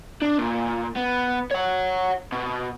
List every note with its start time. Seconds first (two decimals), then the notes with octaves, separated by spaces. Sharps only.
0.22 D4
0.39 A#2
0.96 B3
1.51 C#5 F#5
2.32 B2